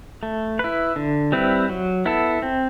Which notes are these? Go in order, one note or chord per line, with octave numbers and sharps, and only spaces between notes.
A3
E4 B4
D3
G3 C4 E4 B4
F#3
B3 E4 A4
C4